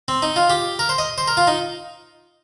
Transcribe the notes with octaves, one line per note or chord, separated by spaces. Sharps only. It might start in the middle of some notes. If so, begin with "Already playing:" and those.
C4
D#4
F4
G4
A#4
C5
D#5
C5
A#4
F4
D#4